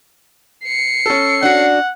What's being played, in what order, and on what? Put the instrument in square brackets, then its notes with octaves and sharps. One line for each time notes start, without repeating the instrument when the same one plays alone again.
[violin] C7 C#7
[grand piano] C#4 A4
[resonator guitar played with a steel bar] D4 F#4 [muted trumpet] F#5